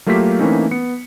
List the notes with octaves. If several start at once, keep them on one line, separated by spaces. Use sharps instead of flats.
F#3 A3 A#3 F4 G4 B6
E3 A3 A#3 C4 C#4 D#4
B3 C#7